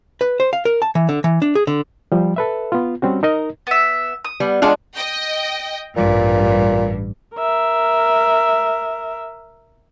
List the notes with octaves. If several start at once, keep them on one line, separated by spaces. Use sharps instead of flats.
B4
C5
F5
A#4
A5
E3
D3
E3
D4
G#4
D3
F3 G3
A4 B4 E5
B3 F4
G3 C4 C#4 F#4
D#4 A#4 D#5
B3 E5
D#6
G3 B3
G#3 D4 F4 F5 F#5
D#5 G5
A1 G2 A#2
A#4 E5